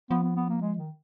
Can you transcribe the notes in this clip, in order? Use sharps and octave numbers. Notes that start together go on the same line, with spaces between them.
F3 B3
B3
B3
A#3
G#3
D#3